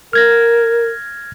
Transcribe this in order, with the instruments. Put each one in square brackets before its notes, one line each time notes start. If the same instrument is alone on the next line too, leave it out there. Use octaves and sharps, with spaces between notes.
[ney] A#4 [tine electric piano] F6 G#6 A#6